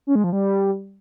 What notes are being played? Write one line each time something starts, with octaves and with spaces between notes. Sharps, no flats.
C#4
G#3
F3
G3